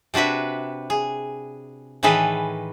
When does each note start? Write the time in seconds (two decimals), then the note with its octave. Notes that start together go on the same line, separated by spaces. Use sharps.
0.14 C3 D4 F#4 B4 E5
0.90 G#4
2.03 A2 D#3 E3 G#4 A4 B4